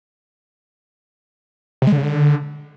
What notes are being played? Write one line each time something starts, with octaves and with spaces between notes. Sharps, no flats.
C3
G#3
D3
C#3
D3